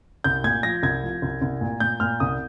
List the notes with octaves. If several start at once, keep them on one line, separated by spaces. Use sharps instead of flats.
C2 G6
A#2 G#6
F3 A#6
C2 G#6
F3
C2
C2
A#2
A#2 G6
A#2 F6
C2 D#6